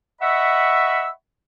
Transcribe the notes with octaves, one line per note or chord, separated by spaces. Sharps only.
D#5 E5 F#5 B5 C#6 E6